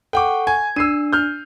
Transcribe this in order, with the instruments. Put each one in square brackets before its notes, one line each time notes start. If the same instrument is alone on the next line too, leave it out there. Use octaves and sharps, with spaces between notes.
[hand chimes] A4 F#5 C#6 [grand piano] G5 D6
[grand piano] G#5 [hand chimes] G#6
[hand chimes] D4 [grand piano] E6 C7 D#7
[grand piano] F6 G6